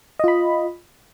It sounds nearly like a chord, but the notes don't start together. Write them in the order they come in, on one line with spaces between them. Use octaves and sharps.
D#5 F4 B5